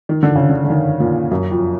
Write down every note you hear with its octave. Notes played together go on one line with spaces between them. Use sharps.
D#3
D3
C#3
D3
D3
D#3
A#2
F#2
F2